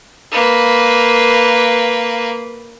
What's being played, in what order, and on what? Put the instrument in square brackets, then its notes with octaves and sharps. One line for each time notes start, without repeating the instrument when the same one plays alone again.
[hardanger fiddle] A#3 B4